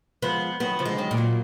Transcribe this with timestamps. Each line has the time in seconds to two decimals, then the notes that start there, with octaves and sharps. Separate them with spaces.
0.22 F3 G#3 B3
0.60 D#3 F#3 B3
0.79 D3 F3
0.85 G#3
0.98 D#3 F#3
1.11 A#2
1.17 F#3 A#3